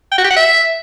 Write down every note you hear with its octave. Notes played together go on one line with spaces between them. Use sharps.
G5
F#4
G4
F#5
E5